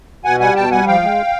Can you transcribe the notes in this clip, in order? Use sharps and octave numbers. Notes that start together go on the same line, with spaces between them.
B2 F#5 G#5
G3 F#5 G#5
B2 G5 A5
G3 F#5 G#5
F3 F5 G5
G#3